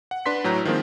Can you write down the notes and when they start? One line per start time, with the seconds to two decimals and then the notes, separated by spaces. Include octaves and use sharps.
0.11 F#5
0.26 D4 B4 C6 B6
0.44 A2 F#3 A#5 G6
0.65 D#3 F3 G#3 A#3 C4